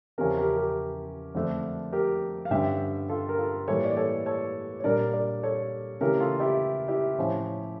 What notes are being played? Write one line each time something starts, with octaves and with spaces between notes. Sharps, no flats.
E2 C#3 F3 C#4 E4 G4 A#4
G4 A#4
G4 A#4
F2 D3 A3 D4
G4 A#4
F5
G2 D3 G3 C#4 E5 G5
F4 A4
A#4
F4 A4
A2 E3 G3 A#3 A4 C#5
D5
A4 C#5
A4 C#5
C#5
A#2 G3 D4 A#4 D5
A#4 D5
A4 C#5
C#3 E3 A3 C#4 G4 A#4
F4 A4
E4 G4
E4 G4
A2 F3 C#4 E4